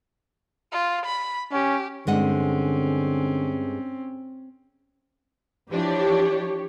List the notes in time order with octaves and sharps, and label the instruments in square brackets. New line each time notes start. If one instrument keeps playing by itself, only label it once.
[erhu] F4
B5
[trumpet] C#4 [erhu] G4
[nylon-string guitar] G2 G#3 F#5 [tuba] D3 [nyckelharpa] C4 C#4
[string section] E3 F3 D4 [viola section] G4 C#5